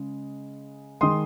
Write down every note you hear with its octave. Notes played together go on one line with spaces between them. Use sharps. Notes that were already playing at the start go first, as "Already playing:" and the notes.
Already playing: C#3 G#3
D#3 G#3 C6 D#6